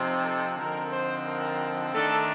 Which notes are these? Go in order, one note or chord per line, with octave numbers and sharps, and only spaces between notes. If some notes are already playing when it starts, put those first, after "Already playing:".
Already playing: C3 F3 C4 D#4
A4
D3 F3 C4 D#4 A#4
C5
A#4
D#3 A3 D4 A4